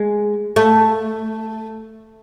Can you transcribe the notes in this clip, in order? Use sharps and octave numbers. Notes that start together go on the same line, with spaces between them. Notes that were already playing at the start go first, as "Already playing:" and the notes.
Already playing: G#3
A3